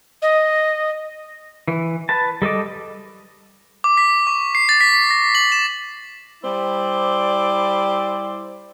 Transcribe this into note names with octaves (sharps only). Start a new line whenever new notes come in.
D#5
E3
B4 A5
G3 A4 D#5 D6
D6
B6
C#6
C7
A6
B6
A#6
F#7
E7
G3 E4 C5 D5